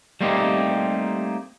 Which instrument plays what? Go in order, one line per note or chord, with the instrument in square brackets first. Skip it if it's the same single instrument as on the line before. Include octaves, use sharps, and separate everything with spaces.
[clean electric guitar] G3 A3 A#3 C4 D#4 G4